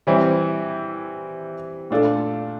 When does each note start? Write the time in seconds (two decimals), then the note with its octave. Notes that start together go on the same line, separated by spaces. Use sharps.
0.07 E3 G3 C4 E4 G4
1.91 A#2 A3 D4 F4 A4